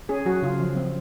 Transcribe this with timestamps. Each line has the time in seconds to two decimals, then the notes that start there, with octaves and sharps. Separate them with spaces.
0.09 C#4 G#4
0.26 F#3 F#4
0.42 C#3 F4
0.60 F3
0.77 C4